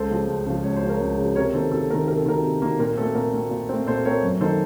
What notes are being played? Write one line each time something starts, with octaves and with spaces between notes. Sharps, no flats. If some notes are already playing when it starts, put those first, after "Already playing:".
Already playing: C#2 A4 C5
C#3 F3
C#2
C#3 F3
C#2 C#5
C5
C#3 F3
A#4 C#5
C#2
C#3 F3
C3 A#4 C#5
D#3 A#3 A4 C5
C3 A4
D#3 A#3 A#4
C3 A#4
A4
D#3 A#3 A#4
C3
D#3 A#3
A#2 A#4
A3 C4 A4
A#2 A#4
A3 C4
A#2
A3 C4
A#2 A4 C5
A3 C4 A#4 C#5
F#2
D#3 A#3 D#4 A4 C5